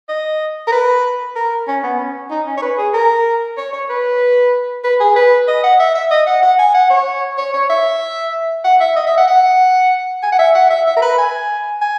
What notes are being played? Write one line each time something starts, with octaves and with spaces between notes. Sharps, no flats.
D#5
A#4
B4
A#4
C#4
B3
C#4
D#4
C#4
C#5
B4
G#4
A#4
C#5
C#5
B4
B4
G#4
B4
D#5
F#5
E5
E5
D#5
F#5
F#5
G#5
F#5
C#5
C#5
C#5
E5
F#5
E5
D#5
E5
F#5
F#5
G#5
F#5
E5
F#5
E5
E5
A#4
B4
G#5
G#5